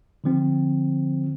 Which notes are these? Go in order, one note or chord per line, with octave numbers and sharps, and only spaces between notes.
D3 F3 C4